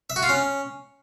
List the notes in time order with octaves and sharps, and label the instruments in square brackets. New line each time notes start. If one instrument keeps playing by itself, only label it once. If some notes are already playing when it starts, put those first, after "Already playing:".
[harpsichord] E5
F#4
F4
C#4